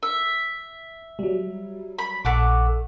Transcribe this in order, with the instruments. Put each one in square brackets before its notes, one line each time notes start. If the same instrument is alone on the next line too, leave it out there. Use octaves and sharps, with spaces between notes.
[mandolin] E5
[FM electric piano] F#3 G3
[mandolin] B5
[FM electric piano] A#1 [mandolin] A3 F#5 D6